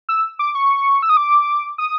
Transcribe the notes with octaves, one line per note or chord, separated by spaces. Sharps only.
E6
D6
C#6
E6
D#6
D6
D#6